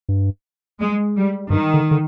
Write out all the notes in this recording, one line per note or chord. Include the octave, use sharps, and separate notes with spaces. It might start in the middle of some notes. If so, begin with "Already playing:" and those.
G2
G#3
G3
G2 D#3
D3
D3